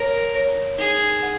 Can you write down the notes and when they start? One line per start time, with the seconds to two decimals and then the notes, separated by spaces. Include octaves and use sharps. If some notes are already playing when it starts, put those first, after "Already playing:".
Already playing: A#4 C#5
0.35 C#5
0.79 D#4 G#4
1.23 F#5